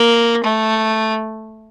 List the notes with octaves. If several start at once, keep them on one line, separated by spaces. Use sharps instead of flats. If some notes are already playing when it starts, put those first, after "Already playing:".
Already playing: A#3
A3